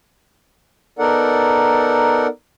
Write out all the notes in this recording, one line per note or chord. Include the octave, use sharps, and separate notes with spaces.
B3 D#4 A4 A#4 D5 F#5